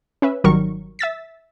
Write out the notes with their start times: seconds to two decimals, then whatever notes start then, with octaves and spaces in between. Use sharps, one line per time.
0.22 C#4 B4 E5
0.44 G#1 D#3 F#3 G3 A#4 C#6
0.99 E5 E6 A6 B6